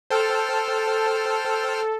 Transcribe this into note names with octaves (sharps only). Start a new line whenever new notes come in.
A4 C5 G5 F6